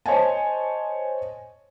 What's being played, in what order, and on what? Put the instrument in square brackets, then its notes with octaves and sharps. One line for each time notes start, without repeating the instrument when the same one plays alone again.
[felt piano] C5 C#5 D#5 G#5 A5